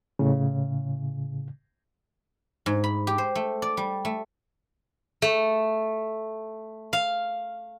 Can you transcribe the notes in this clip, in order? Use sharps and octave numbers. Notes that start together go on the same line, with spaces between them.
A2 C#3
G#2
B5
G4
C5
A3
D5
G3
A3
A3
F5